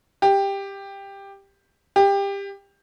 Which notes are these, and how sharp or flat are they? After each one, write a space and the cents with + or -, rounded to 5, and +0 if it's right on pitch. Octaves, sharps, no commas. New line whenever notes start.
G4 +10
G4 +20